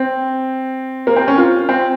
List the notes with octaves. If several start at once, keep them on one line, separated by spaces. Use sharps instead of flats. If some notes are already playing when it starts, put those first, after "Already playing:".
Already playing: C4
A#3
C4
C#4
F4
C4